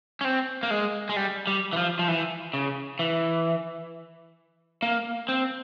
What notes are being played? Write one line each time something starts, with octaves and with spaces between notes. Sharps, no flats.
C#4
C4
A#3
G#3
G#3
G3
G3
E3
F3
F3
E3
C#3
E3
A#3
C4